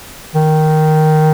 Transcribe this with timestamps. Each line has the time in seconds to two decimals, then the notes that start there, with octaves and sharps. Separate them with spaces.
0.35 D#3